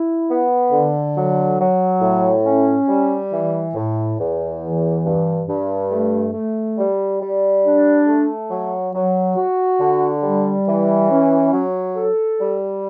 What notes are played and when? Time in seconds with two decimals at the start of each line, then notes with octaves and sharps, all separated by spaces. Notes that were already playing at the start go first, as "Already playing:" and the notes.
Already playing: E4
0.29 B3
0.72 D3
1.16 F#3
1.59 F#3
2.01 A2
2.45 C#4
2.88 G3
3.32 E3
3.75 A2
4.18 E2
4.62 E3
5.05 G2
5.47 G2
5.91 A3
6.34 A3
6.78 G3
7.21 G3
7.64 D4
8.07 A3
8.50 F#3
8.94 F#3
9.36 F#4
9.79 D3
10.23 G3
10.67 E3
11.10 C#4
11.52 F#3
11.96 A4
12.40 G3